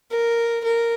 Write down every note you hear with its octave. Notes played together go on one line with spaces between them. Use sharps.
A#4
A#4